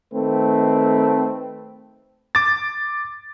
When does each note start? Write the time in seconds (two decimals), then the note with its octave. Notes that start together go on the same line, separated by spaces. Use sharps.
0.14 D#3 A3 C4 B4
2.35 D6 A6